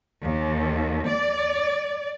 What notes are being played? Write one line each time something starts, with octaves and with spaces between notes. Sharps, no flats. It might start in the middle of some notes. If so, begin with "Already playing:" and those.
D#2
D5